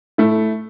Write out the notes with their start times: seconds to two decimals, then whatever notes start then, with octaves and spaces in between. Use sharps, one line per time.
0.18 A3 E4